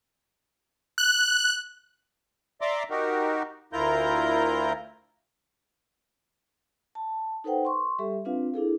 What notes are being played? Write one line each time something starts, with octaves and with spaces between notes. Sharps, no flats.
F#6
D5 E5 A#5 C6 D6
D#4 F#4 G4 A#4
D2 E4 F4 A#4 A#5 G6
A5
D#4 A4 B4 C5 F#5 G5
C6 C#6
G3 G4 A4 E5
C4 D4 F4 B4 F5
D4 E4 G#4 A4